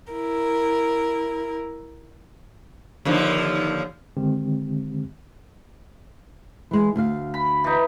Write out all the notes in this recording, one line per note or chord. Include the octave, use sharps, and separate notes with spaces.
E4 A#4
D#2 D3 F3
D3 D#3 G#3 C4 G4
E3 G#3
D2 F5
B5
E3 D#4